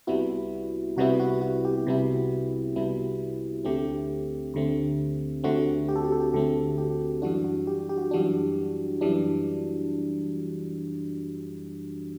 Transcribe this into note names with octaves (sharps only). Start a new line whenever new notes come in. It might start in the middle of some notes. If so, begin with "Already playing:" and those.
C2 C3 G3 B3 E4 F#4
C2 C3 G3 B3 E4 F#4
F#4
F#4
G4
C2 C3 G3 B3 E4
C2 C3 G3 B3 E4
D2 D3 A3 C4 G4
D2 D3 A3 C4
D2 D3 A3 C4 F#4
G4
A4
G4
A4
G4
D2 D3 A3 C4 A4
G4
F#2 E3 G3 D4 F#4
F#4
G4
G4
F#4
F#2 E3 G3 D4 F#4
F#2 E3 G3 D4